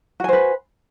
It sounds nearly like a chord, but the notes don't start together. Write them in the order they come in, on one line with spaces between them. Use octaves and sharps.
F#4 G#5 C5 B4